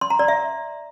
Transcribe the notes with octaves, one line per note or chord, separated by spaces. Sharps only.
C6
A#5
D5
E5